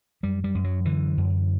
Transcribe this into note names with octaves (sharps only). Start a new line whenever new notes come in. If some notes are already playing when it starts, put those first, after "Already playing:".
F#2 G3
G3
F#2
F#3
D3 E3
F#2